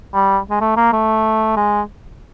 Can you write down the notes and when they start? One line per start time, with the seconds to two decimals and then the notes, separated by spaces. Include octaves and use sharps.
0.14 G3
0.50 G#3
0.61 A3
0.77 A#3
0.93 A3
1.57 G#3